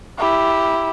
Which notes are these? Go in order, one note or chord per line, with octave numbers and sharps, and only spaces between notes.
E4 G4